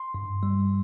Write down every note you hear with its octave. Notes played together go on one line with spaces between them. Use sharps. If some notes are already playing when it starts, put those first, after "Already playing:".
Already playing: C6
G2
G3